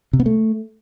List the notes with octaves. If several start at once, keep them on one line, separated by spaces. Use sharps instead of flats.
C3
B3
A3